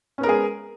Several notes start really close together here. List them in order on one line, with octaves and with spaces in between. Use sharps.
C#4 B3 A#4 G#3 G#4